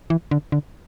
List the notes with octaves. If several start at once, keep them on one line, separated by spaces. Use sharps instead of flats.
E3
D3
D3